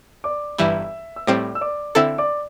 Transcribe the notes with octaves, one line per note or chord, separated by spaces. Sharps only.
D5 D6
G1 G2 E3 G3 E5 E6
E6
A2 G3 C4 D5 D6
E6
D5 D6
D3 C4 E4 A4 E5 E6
D5 D6